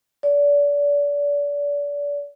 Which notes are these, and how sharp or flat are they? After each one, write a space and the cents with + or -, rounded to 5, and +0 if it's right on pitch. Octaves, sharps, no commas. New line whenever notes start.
D5 -35